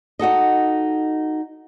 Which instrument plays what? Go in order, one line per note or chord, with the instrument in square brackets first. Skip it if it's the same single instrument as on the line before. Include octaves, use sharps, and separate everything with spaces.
[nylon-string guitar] D#4 F#4 A4 D#5